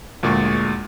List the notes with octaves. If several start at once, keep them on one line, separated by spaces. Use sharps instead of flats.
D2 A#2 G#3 G#4 C#6